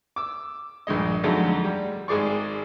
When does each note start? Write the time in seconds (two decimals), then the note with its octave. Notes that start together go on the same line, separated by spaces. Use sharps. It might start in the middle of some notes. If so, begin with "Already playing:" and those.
0.16 D6 E6
0.87 A#1 G2 G#3 D#5
1.23 F2 D3 F#3 G#3 A3 D#4
1.64 G3
2.08 G#1 G#3 G#4 D5 C#6